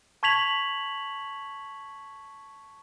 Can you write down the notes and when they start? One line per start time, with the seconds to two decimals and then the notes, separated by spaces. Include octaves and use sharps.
0.23 A5 C#6 G#6 B6 F7 F#7